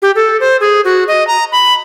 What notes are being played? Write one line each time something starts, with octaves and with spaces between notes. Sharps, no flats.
G4
A4
C5
G#4
F#4
D#5
A#5
B5